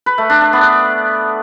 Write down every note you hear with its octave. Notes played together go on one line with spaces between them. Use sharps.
B4
A3
D4
D4
B3